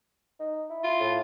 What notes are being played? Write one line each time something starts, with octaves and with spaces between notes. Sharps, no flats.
D#4
E4
F4
A2